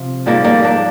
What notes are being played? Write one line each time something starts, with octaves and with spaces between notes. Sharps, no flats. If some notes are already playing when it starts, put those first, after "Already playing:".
Already playing: C3 F3
G#2 F3 G3 A#3
G3 A#3
A#3 D4